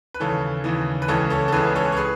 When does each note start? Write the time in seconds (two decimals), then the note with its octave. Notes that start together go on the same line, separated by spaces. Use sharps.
0.14 B4
0.20 D#2 C#3 E3 A4 C#5
0.64 D#2 C#3 E3
1.02 B4
1.08 C#2 C#3 E3 A4 C#5
1.30 A4 C#5
1.48 A4
1.52 C#2 C#3 E3 G#4 B4
1.76 A4 C#5
1.92 C#5
1.97 G#4 B4